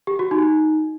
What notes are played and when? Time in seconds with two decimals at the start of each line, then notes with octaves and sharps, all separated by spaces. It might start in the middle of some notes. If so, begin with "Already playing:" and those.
0.07 G4
0.19 F#4
0.31 D#4